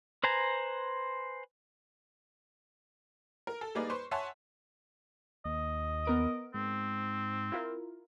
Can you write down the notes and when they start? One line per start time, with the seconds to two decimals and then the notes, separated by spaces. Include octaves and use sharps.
0.24 B4 C5 G#5 A#5
3.47 A#4
3.61 A4
3.75 G3 A#3 D#4 G#4 B4 D5
3.90 B4 C5 C6 C#6
4.11 C#5 E5 F#5 G#5 A5 C6
5.45 D#2 D#5
6.05 B3 A#4 D7
6.54 G#2 C4
7.52 E4 F4 A#4